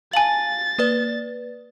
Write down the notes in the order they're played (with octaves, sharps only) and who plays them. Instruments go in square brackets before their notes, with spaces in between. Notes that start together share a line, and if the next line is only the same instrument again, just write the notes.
[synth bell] F5 [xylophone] G#5 A5 F#7 [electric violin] A6
[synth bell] A#3 B4 D5